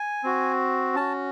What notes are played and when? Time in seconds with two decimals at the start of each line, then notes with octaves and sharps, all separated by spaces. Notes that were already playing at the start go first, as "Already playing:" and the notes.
Already playing: G#5
0.24 C4 F#4
0.96 C#4 F#4 A5